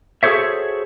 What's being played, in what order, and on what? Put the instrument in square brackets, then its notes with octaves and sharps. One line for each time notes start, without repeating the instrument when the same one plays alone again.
[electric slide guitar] F#4 G#4 A4 C5 C#5 E5